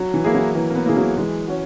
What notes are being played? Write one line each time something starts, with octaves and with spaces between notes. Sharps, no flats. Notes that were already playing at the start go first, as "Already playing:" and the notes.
Already playing: F#3
E3
A#3 E4 G#4
F#3
E3 A#3
A#3
B3
E3 A#3 E4 G#4
F#3
E3 G#3
C#4 F#4